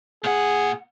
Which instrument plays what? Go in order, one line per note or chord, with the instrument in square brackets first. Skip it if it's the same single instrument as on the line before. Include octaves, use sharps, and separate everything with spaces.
[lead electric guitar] A#2 F#5 [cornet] G#4